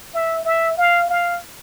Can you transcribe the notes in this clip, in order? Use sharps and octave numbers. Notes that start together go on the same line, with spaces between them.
E5
E5
F5
F5